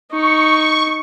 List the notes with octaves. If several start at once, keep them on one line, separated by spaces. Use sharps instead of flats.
D#4 C#6